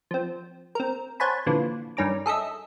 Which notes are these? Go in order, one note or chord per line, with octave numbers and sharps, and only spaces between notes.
F3 C4
C4 A#4
C5 C#5 F#5 G#5 A5 B5
A#2 D3 E3 F3
G2 D#3 C#4 A#5 D6
G#4 A4 D#5 E5